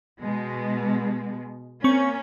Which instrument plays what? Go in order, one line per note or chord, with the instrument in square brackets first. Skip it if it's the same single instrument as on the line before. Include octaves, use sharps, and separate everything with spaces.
[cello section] B2 G#3
[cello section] A#3 C#4 [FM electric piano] C4 C#6